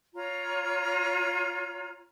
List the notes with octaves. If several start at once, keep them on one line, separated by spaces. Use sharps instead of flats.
F4 C#5 A#5